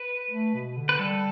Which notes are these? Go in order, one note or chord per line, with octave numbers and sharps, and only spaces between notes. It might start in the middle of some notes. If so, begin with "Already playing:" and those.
Already playing: B4
A3
B2
D3
B4
G3 A4